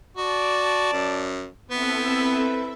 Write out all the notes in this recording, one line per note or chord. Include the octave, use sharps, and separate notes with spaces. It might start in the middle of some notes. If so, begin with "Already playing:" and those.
F#4 D5 A5
F#2
B3 C4 E4 A4 B4 E5